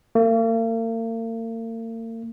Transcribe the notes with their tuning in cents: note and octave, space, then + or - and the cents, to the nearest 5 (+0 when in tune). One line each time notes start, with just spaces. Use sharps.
A#3 -45